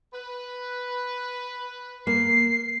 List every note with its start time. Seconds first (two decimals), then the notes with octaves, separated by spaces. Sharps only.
0.14 B4
2.07 A#3 C7